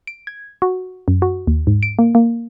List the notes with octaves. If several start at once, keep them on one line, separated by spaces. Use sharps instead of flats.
D7
G#6
F#4
F#2
F#4
D#2
G#2
D7
A#3
A#3